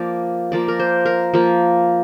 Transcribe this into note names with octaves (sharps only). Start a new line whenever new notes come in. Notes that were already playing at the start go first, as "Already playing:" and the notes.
Already playing: F3 A#3 D5
F3 A#3 D5
A#4
C5
A#4
F3 A#3